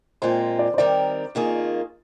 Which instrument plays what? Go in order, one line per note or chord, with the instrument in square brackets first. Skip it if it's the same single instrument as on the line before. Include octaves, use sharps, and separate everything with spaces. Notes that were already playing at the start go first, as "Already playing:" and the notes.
[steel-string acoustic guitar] A#2 G#3 C4 F4 [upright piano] C5
[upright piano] D5
C5
[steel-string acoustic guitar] D#3 G3 C4 G4 A#4 [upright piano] D5
[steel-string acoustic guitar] F2 D#3 A#3 F4 G#4